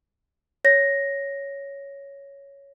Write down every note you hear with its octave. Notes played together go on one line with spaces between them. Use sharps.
C#5 A#6